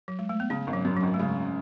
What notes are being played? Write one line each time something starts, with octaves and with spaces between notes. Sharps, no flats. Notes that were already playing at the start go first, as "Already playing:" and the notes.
F#3
G#3
A3
B3
C#3 C#4
G#1
F#3
F#2
F#3
G#1
A3
C#3 G#3